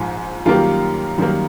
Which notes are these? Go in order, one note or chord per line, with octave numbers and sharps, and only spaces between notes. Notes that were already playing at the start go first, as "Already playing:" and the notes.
Already playing: A#1 G#2 F3
F#2 D#3 G3 A#3 F4 G4
F#2 D#3 G3 A#3